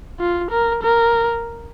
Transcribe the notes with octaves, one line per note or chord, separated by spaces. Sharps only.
F4
A#4
A#4